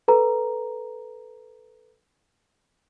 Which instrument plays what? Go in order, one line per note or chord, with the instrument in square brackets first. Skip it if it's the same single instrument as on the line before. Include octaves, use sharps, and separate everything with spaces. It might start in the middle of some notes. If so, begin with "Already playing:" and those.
[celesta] A4 B4 A#5